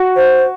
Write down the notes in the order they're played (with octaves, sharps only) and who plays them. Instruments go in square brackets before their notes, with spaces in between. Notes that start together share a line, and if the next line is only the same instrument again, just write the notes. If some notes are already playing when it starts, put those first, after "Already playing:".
Already playing: [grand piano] F#4
[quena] C5